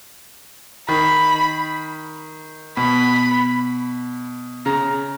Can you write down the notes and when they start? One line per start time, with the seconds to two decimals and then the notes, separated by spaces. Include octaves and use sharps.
0.89 D#3 B5
2.77 B2 B5
4.66 C#3 A#5